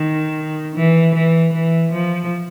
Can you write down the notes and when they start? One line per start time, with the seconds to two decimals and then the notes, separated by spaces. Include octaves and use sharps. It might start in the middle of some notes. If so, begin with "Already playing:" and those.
Already playing: D#3
0.76 E3
1.15 E3
1.53 E3
1.92 F3